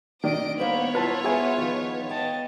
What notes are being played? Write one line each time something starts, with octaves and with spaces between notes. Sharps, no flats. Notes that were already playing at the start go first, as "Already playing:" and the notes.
D#3 D4 D#5 D7
A#3 B3 C5 C#5 B5
E4 F4 B4 A5 A#5
F4 G#4 E5 F#5 G#5
D#3 F3
D#5 G5 A5